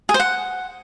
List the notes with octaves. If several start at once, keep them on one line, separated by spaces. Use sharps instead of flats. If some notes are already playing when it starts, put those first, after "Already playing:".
G#4
C5
F#5